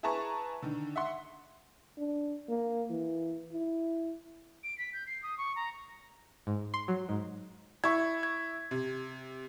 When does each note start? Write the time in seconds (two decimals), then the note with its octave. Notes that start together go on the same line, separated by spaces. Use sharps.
0.03 E4 G#4 B4 A5 A#5 C#6
0.62 D3 D#3
0.96 E5 F#5 C6
1.98 D4
2.49 A#3
2.90 E3
3.52 E4
4.64 D7
4.78 B6
4.93 G6
5.07 C7
5.23 D#6
5.38 C#6
5.56 A#5
6.47 G#2
6.74 C6
6.88 F#3
7.09 G#2
7.84 E4 C#6 G#6
8.23 G#6
8.71 C3